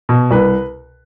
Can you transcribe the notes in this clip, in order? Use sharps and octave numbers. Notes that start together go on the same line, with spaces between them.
B2
C2 B4